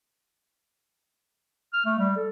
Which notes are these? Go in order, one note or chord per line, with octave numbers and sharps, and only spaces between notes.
F6
A3
G3
A4